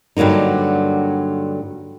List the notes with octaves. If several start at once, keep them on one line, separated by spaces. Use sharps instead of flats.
G2 D3 F#3 A#3 D#4